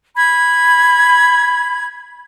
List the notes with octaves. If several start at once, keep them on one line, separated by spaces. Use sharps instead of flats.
B5 G#6